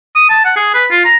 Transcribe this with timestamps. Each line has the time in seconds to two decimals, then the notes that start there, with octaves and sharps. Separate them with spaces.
0.16 D#6
0.30 A5
0.45 F#5
0.56 G#4
0.74 B4
0.91 F4
1.05 A#5